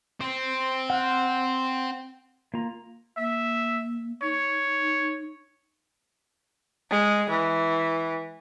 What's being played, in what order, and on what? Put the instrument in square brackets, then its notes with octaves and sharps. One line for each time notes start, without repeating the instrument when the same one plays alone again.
[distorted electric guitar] C4
[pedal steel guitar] F#5 F6 F#6
A#3 F4 A#5
[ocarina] A#3 [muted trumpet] E5
[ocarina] D#4 [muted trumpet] C#5
[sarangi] G#3
E3